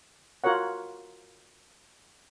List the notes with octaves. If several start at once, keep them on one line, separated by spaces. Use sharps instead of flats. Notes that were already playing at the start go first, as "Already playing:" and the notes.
F4 F#4 A#4 C#5 F#5